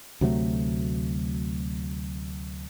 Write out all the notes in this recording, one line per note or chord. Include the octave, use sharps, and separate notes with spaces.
D2 C3 F#3 A3